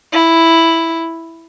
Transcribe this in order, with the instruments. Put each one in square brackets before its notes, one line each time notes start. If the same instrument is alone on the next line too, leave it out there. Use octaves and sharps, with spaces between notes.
[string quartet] E4